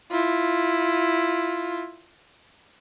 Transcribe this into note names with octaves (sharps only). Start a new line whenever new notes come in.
E4 F4